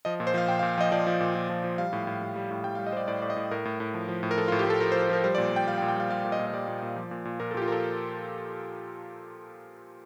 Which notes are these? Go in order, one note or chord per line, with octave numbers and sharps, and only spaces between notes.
F3 D#5
A#2
C5
F3 F5
A#2 G5
F5
A#2
F3 D#5
F3 D5
F3
A#2
A#2
F3
F3
G3 F5
A2
A2
G3
G3
A2
G3 G5
F5
G3
D#5
G3 C5 D5
A2 D5
A2 D5
D#5
A2
A2 A#4
A2
A2
F3
F3
A2
A#4
F3 A4
F4
A2
G4
A2 A4
F3 A#4
C5
F3
C5
F3 A#4
G3 C5
D5
A#2
G3 G5
G3 F5
G5
A#2
G5
G3 F5
G3 F5
A#2
D#5
A#2
D#5
G3 D5
A#2
A#2
F3
A#2
A#2
A#2 A#4
A4
A#2 G4
F4
F3 A4 A#4